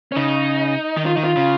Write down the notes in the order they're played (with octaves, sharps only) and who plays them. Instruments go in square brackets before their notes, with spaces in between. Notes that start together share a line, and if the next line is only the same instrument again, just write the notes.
[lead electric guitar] C#4
[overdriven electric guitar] C#3 [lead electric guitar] D#4
[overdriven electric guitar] D#3
[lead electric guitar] F4
[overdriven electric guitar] D#3 [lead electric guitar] D#4
[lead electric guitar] F4
[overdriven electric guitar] C#3